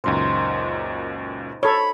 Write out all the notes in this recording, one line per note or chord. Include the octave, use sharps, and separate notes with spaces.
C#2 F#2 A#2 D#4 C5
A4 C#5 B5